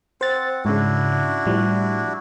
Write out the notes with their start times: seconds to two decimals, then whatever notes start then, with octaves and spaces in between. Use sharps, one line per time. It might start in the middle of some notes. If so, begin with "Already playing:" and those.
0.21 C4 C5 F#5 A6
0.65 G#2 C#3 D4 E4 F#4
1.46 A2 F3 G3